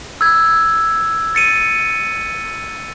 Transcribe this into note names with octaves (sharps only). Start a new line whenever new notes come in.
E6 G#6
A6 C#7 D#7